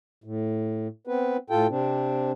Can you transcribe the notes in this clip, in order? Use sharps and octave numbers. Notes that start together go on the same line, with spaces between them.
A2
B3 C4 B4
A2 F4 A4 G5
C3 C4 D4